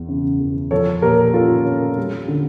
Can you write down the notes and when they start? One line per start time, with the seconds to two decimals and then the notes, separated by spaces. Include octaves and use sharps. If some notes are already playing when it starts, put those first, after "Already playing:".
Already playing: E2
0.09 C#3
0.40 E2
0.71 F3 A4 C#5
1.02 A#2 G4 A#4
1.34 C#4 F4 A4
1.66 C#4
1.97 G3
2.28 D3